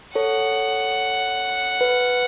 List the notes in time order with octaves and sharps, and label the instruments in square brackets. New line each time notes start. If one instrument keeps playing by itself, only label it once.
[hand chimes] A4 C#5 [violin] F#5
[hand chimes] B4